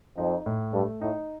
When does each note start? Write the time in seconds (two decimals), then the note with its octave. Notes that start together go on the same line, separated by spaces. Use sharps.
0.17 F2 D#4
0.46 A2
0.73 G2 A3
1.01 A2 D#4